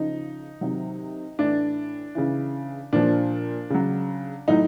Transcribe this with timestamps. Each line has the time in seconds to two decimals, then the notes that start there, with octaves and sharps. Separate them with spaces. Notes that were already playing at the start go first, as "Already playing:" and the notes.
Already playing: C#3 F3 D#4
0.61 C3 D#3 F#3
1.39 A2 E3 D4
2.15 C#3 E3
2.93 A#2 F3 D4
3.70 C#3 F#3
4.48 A2 F#3 D#4